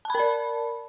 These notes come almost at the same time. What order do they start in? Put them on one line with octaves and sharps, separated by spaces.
A5 B5 A#4 D5